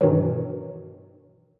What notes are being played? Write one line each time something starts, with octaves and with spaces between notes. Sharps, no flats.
G2 B2 D#3 E3 F#3